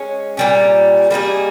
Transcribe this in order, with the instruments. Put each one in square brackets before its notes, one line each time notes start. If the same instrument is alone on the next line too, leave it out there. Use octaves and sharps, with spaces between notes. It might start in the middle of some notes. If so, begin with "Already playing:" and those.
Already playing: [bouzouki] G#3 C#4
A#2 G3 C#4
G3 A#3 D#4 G#4